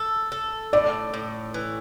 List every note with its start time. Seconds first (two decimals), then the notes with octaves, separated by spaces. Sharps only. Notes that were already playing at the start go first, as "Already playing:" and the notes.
Already playing: A4
0.32 A4
0.73 A2 D5
1.14 A2
1.54 E3